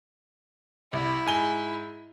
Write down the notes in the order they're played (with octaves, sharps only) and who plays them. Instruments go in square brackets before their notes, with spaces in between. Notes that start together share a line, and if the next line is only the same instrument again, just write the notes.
[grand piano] C2 [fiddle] E4
[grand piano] G#2 G#5 G7